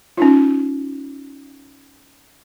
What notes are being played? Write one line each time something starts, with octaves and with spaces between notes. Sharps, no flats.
C#4 D#4 F4